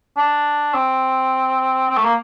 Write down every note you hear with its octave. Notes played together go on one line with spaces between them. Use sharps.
D4
C4
C4
A3
A#3